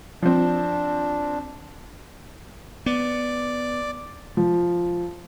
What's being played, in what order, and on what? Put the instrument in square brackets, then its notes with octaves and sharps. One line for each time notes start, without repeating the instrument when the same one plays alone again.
[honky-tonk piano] F3 C4 [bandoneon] D4
[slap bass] B3 [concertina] D5
[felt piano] F3